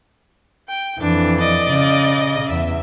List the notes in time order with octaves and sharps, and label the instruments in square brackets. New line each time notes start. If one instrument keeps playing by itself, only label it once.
[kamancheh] G5
[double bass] F2 E3 [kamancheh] D4
[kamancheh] D5 D#5
[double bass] C#3
[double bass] E2 [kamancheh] E5